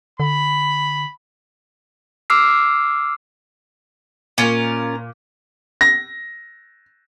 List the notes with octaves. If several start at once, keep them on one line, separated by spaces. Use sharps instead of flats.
D3 B5
D6 E6 F6 C7
A#2 C#4 F4 A#4
A#6